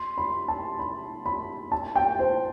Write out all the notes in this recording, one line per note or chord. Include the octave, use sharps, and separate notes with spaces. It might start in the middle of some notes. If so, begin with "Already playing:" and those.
Already playing: C6
B5
A5
B5
B5
A5
G5
C5